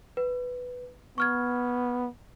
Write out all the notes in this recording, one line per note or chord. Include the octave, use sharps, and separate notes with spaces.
B4
B3 C#6 F6 G#6